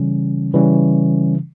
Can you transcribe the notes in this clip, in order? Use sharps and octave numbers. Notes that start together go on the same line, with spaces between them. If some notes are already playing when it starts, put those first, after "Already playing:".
Already playing: C#3 E3 G3 C#4
C#3 E3 G3 C#4